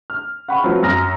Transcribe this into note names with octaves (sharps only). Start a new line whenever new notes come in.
F6
F#5 G5 B5 C#6
F3 F#3 A3 C4 F4 B4
F#2 D#6 F6 A#6